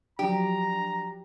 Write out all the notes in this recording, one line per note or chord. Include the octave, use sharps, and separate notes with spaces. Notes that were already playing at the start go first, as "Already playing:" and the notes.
F3 F#3 D4 G4 A#5